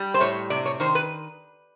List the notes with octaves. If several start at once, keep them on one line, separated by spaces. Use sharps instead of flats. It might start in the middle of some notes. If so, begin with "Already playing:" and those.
Already playing: G3
C5
A2 C#5
C3 D5
C#5
D#3 C5
B4